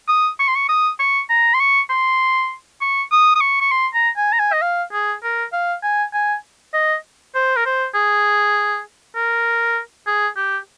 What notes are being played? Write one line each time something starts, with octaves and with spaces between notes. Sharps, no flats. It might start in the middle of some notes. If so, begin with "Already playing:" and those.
D#6
C#6
C6
C#6
D#6
C#6
A#5
C6
C#6
C6
C#6
D#6
D#6
C#6
C#6
C6
A#5
G#5
A#5
G#5
D#5
F5
G#4
A#4
F5
G#5
G#5
D#5
C5
A#4
C5
G#4
A#4
G#4
G4